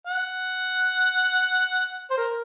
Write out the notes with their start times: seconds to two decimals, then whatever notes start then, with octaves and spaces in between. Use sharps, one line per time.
0.07 F#5
2.11 C5
2.18 A#4